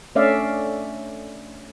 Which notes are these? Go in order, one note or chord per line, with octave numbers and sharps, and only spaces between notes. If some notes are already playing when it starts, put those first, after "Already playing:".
A3 C#4 D4 D5 E5 F5